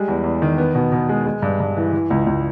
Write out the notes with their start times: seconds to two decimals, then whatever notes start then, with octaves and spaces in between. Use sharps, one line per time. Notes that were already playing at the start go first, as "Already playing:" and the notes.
Already playing: G3 G#3
0.08 E2
0.24 E2
0.42 D#3
0.58 B3
0.75 B2
0.92 B2
1.09 G#3
1.26 G#3
1.42 G2
1.60 G2
1.77 E3
1.93 E3
2.10 C#2
2.27 C#2